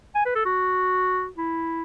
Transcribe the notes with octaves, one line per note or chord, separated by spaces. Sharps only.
G#5
B4
A4
F#4
E4